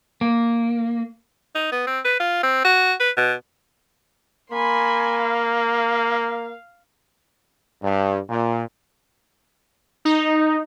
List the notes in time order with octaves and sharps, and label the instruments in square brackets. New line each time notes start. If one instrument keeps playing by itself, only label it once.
[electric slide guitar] A#3
[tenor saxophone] D#4
B3
C4
B4
F4
C4
F#4
B4
B2
[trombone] A#3 [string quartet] G#5 B5 C6
[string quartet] F5
[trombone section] G2
A#2
[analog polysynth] D#4